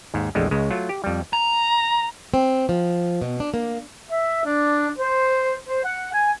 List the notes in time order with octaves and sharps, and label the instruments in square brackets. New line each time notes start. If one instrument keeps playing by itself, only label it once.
[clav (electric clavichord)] D#2 G#2
A#1 E2 D3 G3 G#3
C#2 C#3 G#3
F#3 A3 F4
G4
F2 G3
[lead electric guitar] A#5
[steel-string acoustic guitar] C4
F3
B2
D4
A#3
[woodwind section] E5
D4
C5
C5
F#5
G#5